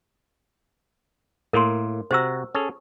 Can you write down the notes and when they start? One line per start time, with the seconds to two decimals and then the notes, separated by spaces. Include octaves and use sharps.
1.53 A2 A#3 A#4 C6
2.11 C3 F#4 C5 A#5 E6
2.55 C#4 G#4 A4